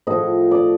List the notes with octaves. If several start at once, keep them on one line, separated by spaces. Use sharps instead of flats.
A2 F3 D#5
D5